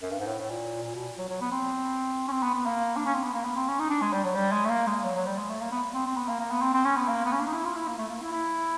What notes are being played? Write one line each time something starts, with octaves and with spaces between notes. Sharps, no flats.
F#2
G2
G#2
A2
A2
A#2
A#2
B2
F#3
F#3
B3
C4
C#4
C4
B3
B3
A#3
D4
C#4
C4
B3
A#3
B3
C4
C#4
D#4
D4
G#3
G3
F#3
G3
G#3
A3
A#3
G#3
F#3
F#3
G3
G#3
A3
A#3
B3
C4
C4
B3
A#3
A#3
B3
C4
C4
C#4
B3
A#3
B3
C#4
D4
D#4
E4
F4
E4
A#3
A3
A#3
E4
E4